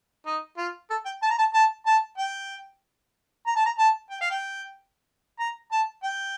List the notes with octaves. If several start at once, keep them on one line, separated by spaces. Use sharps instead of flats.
D#4
F4
A4
G5
A5
A#5
A5
A5
A5
G5
A#5
A5
A#5
A5
G5
F5
G5
A#5
A5
G5